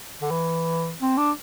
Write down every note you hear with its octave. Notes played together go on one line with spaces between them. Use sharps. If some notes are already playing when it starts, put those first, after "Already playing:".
D3
E3
C4
D4